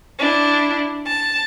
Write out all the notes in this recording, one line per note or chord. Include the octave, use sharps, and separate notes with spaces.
D4 E4
A5